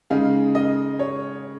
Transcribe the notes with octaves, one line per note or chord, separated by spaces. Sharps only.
C#3 G#3 D#4 F5
D#5
C#5